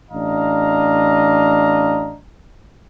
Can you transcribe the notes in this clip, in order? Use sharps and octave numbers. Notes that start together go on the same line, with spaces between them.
A1 D4 D#5 F5 A#5